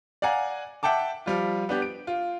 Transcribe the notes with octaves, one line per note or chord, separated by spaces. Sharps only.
D5 F5 F#5 G#5 A#5
E5 F#5 G5 A5 D6
F3 G3 F4
B3 D4 G4
D7
F4